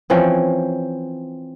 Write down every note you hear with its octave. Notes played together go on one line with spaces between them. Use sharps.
E3 F3 C4 C#4